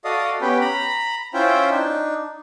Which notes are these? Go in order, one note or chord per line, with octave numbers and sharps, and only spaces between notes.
F#4 A4 D5 D#5 F5 D#6
B3 C#4 G4 B4 G5
A#5 B5
C#4 E4 F4 C5 E5 G5
D4 D#4